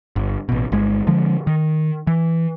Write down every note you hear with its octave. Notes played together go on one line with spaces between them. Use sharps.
G1
A1 B2
G1 G#3
D3 F3 G#3
D#3
E3